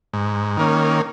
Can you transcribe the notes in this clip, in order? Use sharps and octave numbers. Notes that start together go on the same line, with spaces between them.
G#2
D#3 A#3 C#4